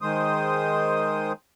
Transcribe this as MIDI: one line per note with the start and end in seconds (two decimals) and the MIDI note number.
0.01 1.32 51
0.01 1.32 56
0.01 1.32 72
0.01 1.32 87